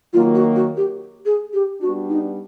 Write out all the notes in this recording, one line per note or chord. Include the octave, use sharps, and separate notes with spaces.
D#3 F#3 A#3 F4
F#4
F#4
G4
G#4
G4
G3 B3 D4 F#4
D#4